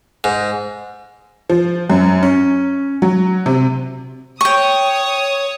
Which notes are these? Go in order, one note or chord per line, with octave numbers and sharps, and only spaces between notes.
G#2
F3
F#2
C#4
F#3
C3
C#5 G5 C#6 D#6